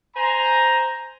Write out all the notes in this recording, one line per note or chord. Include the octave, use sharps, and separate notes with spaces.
C5 G#5 A#5